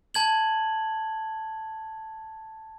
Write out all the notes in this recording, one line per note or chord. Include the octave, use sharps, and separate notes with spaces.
A5 G#6 F#7